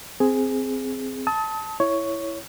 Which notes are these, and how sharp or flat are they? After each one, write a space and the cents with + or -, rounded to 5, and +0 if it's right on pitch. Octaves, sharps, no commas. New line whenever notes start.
C4 -10 G#4 +5
A5 +0 D#6 +40
E4 +0 C#5 +5